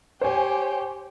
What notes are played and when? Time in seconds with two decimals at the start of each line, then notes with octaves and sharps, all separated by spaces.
0.21 G4 C5 C#5 G#5